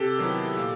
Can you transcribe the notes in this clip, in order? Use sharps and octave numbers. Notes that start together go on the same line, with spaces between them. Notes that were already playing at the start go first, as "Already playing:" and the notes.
Already playing: C3 G4 A4
D#3 F#3 B3 E4
A#2